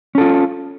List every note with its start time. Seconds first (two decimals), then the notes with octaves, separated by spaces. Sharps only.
0.15 C#4
0.18 A4
0.21 F4